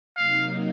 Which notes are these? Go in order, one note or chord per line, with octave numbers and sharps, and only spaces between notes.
C3 F#3 A#3 D#4 F5